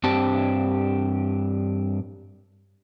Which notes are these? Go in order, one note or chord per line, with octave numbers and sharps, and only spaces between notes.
G2 C4 D4 G4 A5